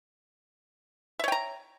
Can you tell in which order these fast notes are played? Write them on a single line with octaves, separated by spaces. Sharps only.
E5 C#5 G5 A#5